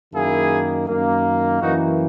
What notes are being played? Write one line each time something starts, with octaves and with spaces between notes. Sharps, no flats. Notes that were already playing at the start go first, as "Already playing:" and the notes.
F#2 D#3 A#3 E4 G#4
F#2 D#3 A#3
F#2 E3 A#3 D#4 F#4